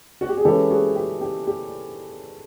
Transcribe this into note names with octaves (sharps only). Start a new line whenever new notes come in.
F#4
G4
G#4
E3 G#3 C#4 G4 A4
F#4 G#4
G4
G4
G4